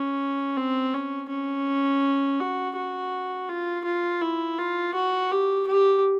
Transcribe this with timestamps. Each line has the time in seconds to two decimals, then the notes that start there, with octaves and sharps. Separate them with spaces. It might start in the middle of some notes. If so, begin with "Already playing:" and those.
Already playing: C#4
0.57 C4
0.94 C#4
1.30 C#4
2.40 F#4
2.76 F#4
3.49 F4
3.85 F4
4.21 E4
4.58 F4
4.95 F#4
5.32 G4
5.67 G4